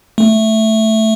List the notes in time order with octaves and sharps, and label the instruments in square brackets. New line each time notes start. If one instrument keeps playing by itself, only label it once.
[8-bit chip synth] A3